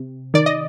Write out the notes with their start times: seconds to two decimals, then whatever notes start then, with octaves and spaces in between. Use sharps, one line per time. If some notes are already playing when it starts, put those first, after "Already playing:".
Already playing: C3
0.34 D#3 D5
0.46 D#5